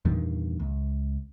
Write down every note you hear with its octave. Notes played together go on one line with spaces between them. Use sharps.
E2 G2 A#2 D#3
C#2